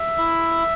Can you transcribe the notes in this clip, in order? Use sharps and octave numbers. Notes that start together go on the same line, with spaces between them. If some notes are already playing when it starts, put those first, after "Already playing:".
Already playing: E5
E4